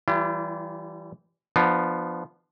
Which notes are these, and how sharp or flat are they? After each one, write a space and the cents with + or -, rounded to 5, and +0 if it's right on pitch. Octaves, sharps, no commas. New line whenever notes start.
E3 +0 G3 -25 E4 +45
F3 +0 B3 +0 D4 +35